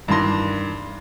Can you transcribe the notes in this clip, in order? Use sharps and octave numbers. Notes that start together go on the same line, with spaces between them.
G2 D#3 E3 D4 C6 A#6